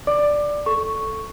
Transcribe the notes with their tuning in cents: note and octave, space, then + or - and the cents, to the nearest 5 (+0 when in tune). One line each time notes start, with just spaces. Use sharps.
D5 +0 D6 +20
A4 +0 C#6 +0